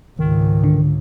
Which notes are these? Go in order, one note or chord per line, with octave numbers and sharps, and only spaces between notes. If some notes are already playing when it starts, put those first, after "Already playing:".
C#2 G#2 D#3
D3